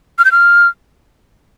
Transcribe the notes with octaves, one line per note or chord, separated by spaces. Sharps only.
F6
G6
F6